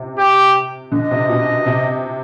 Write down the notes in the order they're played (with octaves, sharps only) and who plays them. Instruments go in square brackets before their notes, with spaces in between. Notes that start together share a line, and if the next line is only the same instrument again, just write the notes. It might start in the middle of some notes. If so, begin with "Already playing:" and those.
Already playing: [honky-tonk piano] C3
[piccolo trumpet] G4
[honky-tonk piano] D3 [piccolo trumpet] D#5
[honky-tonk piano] C3
B2
C3